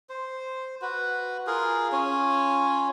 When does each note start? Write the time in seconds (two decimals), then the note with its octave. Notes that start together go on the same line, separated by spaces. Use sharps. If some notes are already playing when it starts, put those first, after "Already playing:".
0.10 C5
0.82 F#4 B4
1.47 F4 G#4 A#4
1.92 C#4 F4 C#5 G#5